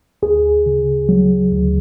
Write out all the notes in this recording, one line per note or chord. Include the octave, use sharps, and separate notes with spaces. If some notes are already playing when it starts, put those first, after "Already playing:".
D2 G#4
C#3
F#3
D2